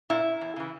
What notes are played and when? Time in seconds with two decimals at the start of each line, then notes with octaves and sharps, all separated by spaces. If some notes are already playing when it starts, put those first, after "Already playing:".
0.10 A#2 E4
0.41 E2
0.56 C#3 E3